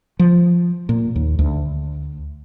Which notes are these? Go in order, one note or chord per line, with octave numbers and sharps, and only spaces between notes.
F3
A#2
D#2
D2